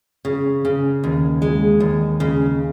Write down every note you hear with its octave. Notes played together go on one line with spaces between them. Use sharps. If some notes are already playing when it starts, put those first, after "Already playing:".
C#3
C#3
D#2
G#3
D#2
C#3